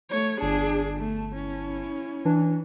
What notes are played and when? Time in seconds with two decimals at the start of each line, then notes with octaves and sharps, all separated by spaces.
0.11 A3 C#5
0.40 G1 D4 G#4 A5
0.97 A3
1.35 C#4 E4
2.25 E3 D4